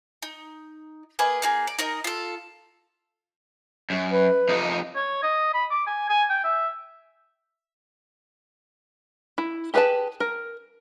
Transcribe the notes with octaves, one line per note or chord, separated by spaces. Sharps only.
D#4
A#3 G#4 B4 D#5
A#3 D#4 G#4
D5
D#4 A#4 D#5
F4 A4
F#2
B4
F2 D#4
C#5
D#5
B5
D6
G#5
G#5
G5
E5
E4
G4 G#4 B4 G5 A5
A#4